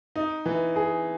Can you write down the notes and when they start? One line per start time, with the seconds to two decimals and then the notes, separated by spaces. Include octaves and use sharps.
0.16 D#4
0.45 E3
0.76 G#4